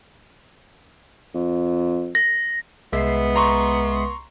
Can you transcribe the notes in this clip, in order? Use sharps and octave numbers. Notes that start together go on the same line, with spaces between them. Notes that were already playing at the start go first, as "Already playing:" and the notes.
F2
A#6
C2 G#3 B3 E5 C7
A#5 C6 C#6